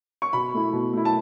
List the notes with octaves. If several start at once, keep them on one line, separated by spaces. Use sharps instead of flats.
C#6
B2 B5
A3 E4
B2
A3 E4
A5